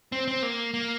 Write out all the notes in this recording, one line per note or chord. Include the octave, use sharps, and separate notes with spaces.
C4
C4
A#3
A#3